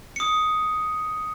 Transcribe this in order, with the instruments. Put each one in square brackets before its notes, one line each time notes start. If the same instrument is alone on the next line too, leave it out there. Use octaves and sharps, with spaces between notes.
[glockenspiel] D#6 C#7